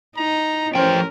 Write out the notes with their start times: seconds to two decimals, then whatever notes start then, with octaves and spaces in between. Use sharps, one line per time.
0.17 D#4 A#5
0.75 A1 F3 C#4 A#4 C5 G5